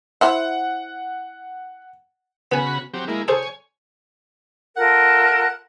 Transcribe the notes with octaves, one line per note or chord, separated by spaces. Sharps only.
E4 C5 E5 F#5
C#3 B3 F#4 G#5 B5
F#3 C4 G4
G#3 A#3 E4
G#4 A4 C5 C#5 G#5
F4 A4 A#4 F#5